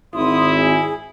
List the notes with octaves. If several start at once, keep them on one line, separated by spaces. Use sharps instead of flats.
G#1 E4 C6 D#6
G#4